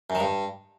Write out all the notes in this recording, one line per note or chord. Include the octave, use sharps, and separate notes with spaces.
F#2
D#3
G2